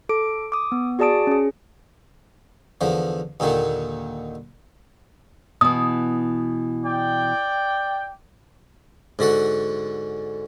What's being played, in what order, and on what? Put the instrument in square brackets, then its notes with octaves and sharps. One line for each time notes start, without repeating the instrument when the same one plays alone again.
[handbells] A4 D6 D7
D6 D#6
B3
F#4 G#4 D5 A5 D#6 D7
C#4 G#4
[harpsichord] E2 D3 F3
D#2 A#2 D3 D#3
[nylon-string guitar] B2 E3 [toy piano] D#6
[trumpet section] D5 G5
[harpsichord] G#2 D3 F#4 F#5